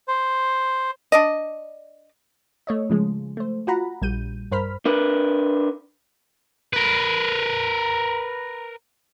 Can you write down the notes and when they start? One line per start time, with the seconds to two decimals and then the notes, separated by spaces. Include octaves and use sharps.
0.08 C5
1.12 D4 D5 D#5
2.67 A3 C#5 D#5
2.90 C#3 F3 G#3
3.37 A3 C5
3.67 F4 F#4 F#5 A#5 B5
4.02 A#1 G3 G6 D#7
4.52 G2 A#4 C5 B5 F6 B6
4.85 D4 A#4 B4
6.73 A#4 B4